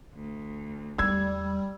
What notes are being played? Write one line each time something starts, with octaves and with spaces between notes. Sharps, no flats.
D2
E2 G3 G#3 E6 G#6